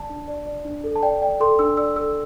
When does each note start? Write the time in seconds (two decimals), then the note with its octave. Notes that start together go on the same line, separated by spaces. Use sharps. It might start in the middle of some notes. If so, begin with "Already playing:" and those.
Already playing: D5 A5
0.10 D4
0.28 D5
0.47 D5
0.65 D4
0.84 A4
0.96 A5
1.02 D5 G5
1.22 D5 G5
1.40 A4 C6
1.59 D4 E6
1.77 D5 E6
1.96 A4 E6